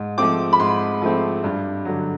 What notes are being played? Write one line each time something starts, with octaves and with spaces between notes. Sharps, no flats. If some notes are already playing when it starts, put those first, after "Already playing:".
Already playing: G#2
F3 A3 C4 D6
B5
G#2 C6
F3 A3 C4
G2
D3 F#3